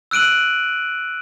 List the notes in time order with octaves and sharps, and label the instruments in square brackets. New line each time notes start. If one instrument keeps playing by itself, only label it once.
[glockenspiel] E6 F#6 D7 D#7 F#7